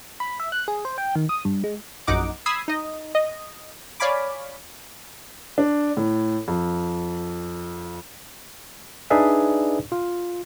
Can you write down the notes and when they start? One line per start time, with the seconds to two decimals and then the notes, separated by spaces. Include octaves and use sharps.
0.20 B5
0.40 E5
0.52 F#6
0.68 G#4
0.85 C5
0.98 G5
1.16 D#3
1.29 D#6
1.45 G2
1.64 G#3
2.07 A#1 F#2 D#4 F#5 D6
2.46 B5 D#6 E6 G#6 C7
2.68 D#4 D#5
3.15 D#5
4.00 C#5 D5 F5 G#5 B5 D6
5.58 D4
5.97 A2
6.48 F2
9.10 D4 D#4 G#4 B4 D5 E5
9.92 F4